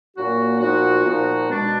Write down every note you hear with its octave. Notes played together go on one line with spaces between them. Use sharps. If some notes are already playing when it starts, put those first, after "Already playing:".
A#2 F#3 A#3 D4 F#4
A#2 F3 B3 D#4 F#4
A#2 F3 B3 D#4 F#4
B2 G#3 D4